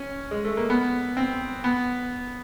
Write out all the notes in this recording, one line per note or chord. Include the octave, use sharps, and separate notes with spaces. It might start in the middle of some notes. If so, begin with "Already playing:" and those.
Already playing: C#4
G#3
A3
A#3
B3
C4
B3